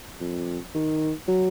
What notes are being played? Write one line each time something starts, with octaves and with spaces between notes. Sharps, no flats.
F2
D#3
F#3